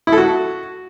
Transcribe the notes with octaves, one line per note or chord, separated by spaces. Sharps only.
E4
A4
F#4